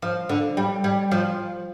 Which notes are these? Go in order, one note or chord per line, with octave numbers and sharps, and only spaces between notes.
F3
D3
G3
G3
F3